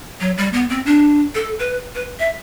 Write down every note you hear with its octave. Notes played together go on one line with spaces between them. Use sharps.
F#3
G3
B3
C4
D4
A4
B4
B4
E5